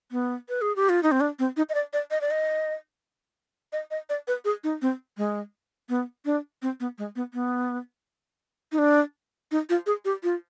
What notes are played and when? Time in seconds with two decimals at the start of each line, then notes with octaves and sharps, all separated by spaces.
0.12 B3
0.49 B4
0.62 G#4
0.76 G4
0.89 F4
1.03 D#4
1.12 C4
1.21 D4
1.39 C4
1.57 D#4
1.69 D#5
1.74 D5
1.93 D5
2.11 D#5
2.21 D5
2.31 D#5
3.73 D#5
3.91 D#5
4.10 D5
4.28 B4
4.45 G#4
4.64 D#4
4.82 C4
5.18 G#3
5.89 B3
6.25 D4
6.62 C4
6.80 B3
6.98 G#3
7.16 B3
7.34 B3
8.72 D#4
8.78 D4
9.51 D#4
9.70 F4
9.86 G#4
10.05 G4
10.23 F4